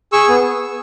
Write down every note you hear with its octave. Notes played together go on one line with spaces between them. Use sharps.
G#4 C#6 E6
B3